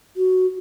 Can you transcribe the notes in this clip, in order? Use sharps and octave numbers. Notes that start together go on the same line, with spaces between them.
F#4